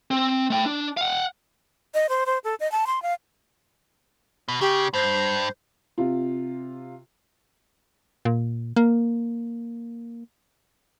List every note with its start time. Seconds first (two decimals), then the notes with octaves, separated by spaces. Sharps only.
0.11 C4
0.50 A3 G5
0.66 D4
0.97 F5 F#5
1.94 D#5
2.09 C5
2.26 C5
2.44 A4
2.60 D#5
2.72 A5
2.87 C6
3.02 F5
4.48 B2
4.61 C#3 G4
4.94 G2 C5
5.98 C3 F4
8.25 A#2
8.76 A#3